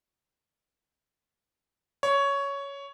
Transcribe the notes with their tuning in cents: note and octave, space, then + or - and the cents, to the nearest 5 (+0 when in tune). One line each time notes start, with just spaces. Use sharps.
C#5 +10